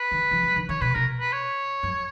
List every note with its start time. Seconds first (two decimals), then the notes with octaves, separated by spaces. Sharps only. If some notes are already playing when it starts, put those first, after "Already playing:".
Already playing: B4
0.11 D#3
0.31 E3
0.43 F#3
0.56 D#3
0.69 D#3 C#5
0.81 B2 B4
0.95 B2 A#4
1.20 B4
1.32 C#5
1.83 F#2